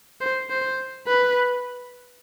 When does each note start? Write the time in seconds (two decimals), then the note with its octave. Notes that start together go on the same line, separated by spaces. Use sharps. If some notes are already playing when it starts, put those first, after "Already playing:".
0.21 C5
0.50 C5
1.07 B4